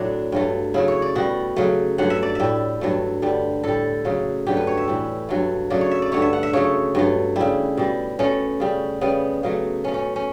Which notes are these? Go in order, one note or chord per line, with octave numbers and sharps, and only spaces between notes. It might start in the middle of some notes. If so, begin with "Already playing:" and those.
Already playing: A2 F#3 A3 D4
G2 F#3 A3
C#3 F#3 A3 E4
C#5
D5
B2 G3 F#4
C#3 F#3 A3
G2 F#3 A3 F#5
E5
D5
A2 G3 E5
G2 F#3 A3
G2 D3 G3
A2 G3 A4
C#3 F#3 A3
G2 D3 F#3 A3 G4
B4
C#5
E5
A2 E3 G3
G2 F#3 A3
C#3 F#3 A3 D5
C#5
E5
D5
G2 D3 A3 C#5
E5
F#5
E5
C#3 F#3 A3 C#5
G2 F#3 A3
C#3 G3 E4
B2 G3
B2 A3 C#4
C#3 G3
C#3 G3 B3
C#3 F#3 A3
B2 A3 C#4
C#4
C#4